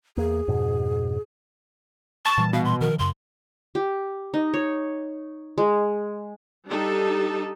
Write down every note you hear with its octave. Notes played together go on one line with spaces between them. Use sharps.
E2 A#3 G#4
F2 G#2 B2
A5 C#6
A#2 E3 G3
B2 F5
C6
D#3 F3 A#4
F#2 C#3 C6
G4
D#4
C#5
G#3
G3 D4 D#4 G4 A4